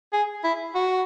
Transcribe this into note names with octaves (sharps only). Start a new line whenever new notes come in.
G#4
E4
F#4